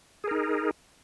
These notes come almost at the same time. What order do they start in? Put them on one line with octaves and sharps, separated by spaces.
G#4 A#4 D#4